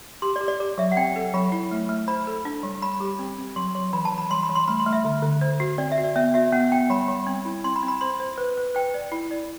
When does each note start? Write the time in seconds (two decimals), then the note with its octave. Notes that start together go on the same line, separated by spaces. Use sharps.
0.22 G4 C6
0.36 D5
0.41 G4
0.48 D5
0.60 G4 D5
0.78 F#3 E5
0.92 F#5
0.97 C4 G5
1.16 A4
1.34 F#3 B5
1.52 E4
1.71 A3
1.89 A3
2.08 C5 B5
2.27 A4
2.45 D4
2.63 G3
2.82 G3 B5
3.00 G4
3.19 C4
3.38 C4
3.56 F#3 C6
3.75 F#3 C6
3.93 E3 B5
4.05 A5
4.13 E3
4.18 B5
4.30 G3 C6
4.43 B5
4.49 G3
4.55 C6
4.68 A3 B5
4.80 C6
4.86 A3
4.93 E5
5.05 D3
5.23 D3
5.41 C5
5.60 F#4
5.78 C4 D5
5.92 E5
5.98 F#4
6.04 D5
6.16 B3 E5
6.34 F#4 E5
6.52 B3 F#5
6.72 B3 G5
6.90 G3 B5
7.08 G3
7.27 C4
7.45 E4
7.64 C4 C6
7.76 B5
7.83 C4
7.88 B5
8.01 C5 C6
8.20 C5
8.38 B4
8.57 B4
8.75 B4 G5
8.94 D5
9.12 E4
9.31 D5